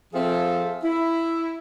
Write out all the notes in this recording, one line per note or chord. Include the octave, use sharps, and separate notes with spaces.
F3 C4 G#4 A4 E5 F5
E4